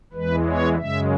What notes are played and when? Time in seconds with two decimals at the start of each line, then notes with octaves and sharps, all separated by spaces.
0.13 E2 E3 G#3 B4
0.46 C#5
0.78 F#2 C#3 G#3 E5